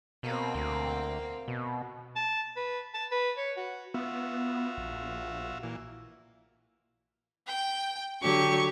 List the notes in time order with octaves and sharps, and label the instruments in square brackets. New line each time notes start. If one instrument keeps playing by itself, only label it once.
[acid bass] B2 [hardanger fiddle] A#3 C4
[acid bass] D2
B2
[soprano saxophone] A5
B4
A5
B4
C#5
F#4
[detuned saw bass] B3 [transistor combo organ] F4 F#4 E5
[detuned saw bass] A#1
[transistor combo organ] A#2 E3
[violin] G5
[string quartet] D3 F#3 C#6 [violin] G4